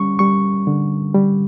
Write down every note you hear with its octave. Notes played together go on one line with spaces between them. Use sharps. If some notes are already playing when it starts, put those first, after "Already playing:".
Already playing: G3 C#4 C#6
G3 C#6
D3
G3